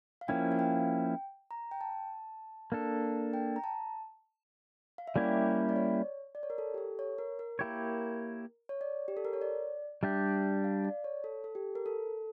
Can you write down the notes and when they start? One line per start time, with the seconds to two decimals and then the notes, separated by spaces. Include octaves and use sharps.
0.21 F5
0.28 F3 A#3 C#4 E4 G5
0.52 F5
0.59 G5
1.51 A#5
1.71 G5
1.81 A5
2.72 A#3 D4 A4
3.33 G5
3.56 A#5
3.64 A5
4.98 F5
5.07 E5
5.15 G3 A#3 C#4 E4 G4 D5
5.69 D5
5.76 C#5
6.35 D5
6.43 C#5
6.50 A#4
6.58 A4
6.74 G4
6.78 A4
6.99 C#5
7.18 A#4
7.39 A#4
7.59 A#3 E4 G4 C#5
8.69 C#5
8.81 D5
9.08 G4
9.17 A4
9.25 A#4
9.33 C#5
9.41 D5
10.03 G3 D4 G4 E5
10.64 F5
10.84 D5
11.04 C#5
11.24 A4
11.44 A4
11.55 G4
11.75 A#4
11.86 A4